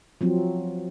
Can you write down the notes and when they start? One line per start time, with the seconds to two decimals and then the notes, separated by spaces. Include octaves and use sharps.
0.21 F3 F#3 C4